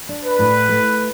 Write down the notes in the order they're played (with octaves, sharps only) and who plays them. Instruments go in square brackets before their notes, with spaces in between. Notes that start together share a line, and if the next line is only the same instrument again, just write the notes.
[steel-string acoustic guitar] D4
[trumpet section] B4
[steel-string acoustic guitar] A2
A3